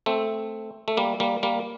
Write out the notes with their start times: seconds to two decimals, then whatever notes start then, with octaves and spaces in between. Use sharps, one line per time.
0.06 A3 C4
0.88 A3
0.97 G3 A#3
1.20 G3 A#3
1.43 G3 A#3